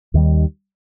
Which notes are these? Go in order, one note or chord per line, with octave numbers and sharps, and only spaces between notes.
D#2 D#3 G3